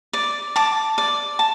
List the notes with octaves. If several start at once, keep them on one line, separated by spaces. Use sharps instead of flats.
D5
A5 D6
D5
A5